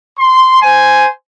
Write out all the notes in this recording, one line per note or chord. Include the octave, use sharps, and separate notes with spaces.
C6
C5 G#5